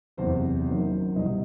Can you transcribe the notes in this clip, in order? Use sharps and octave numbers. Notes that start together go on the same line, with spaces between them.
F#1 E2 C3 C5
F#1 F#2 D#3 F#3
C2 B2 G3 D#5